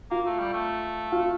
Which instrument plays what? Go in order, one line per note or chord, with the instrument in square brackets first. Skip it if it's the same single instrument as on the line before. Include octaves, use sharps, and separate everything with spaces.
[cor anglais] A#3 [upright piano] F4
[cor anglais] A3
G3
A3
[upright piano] F4